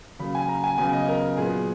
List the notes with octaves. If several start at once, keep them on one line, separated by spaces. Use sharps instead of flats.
C#3 F#3 A#3 B5
G#5
A#5
G#5
C#3 F#3 B3 G#5
D#5
A#4
A#2 F#3 B3 G#4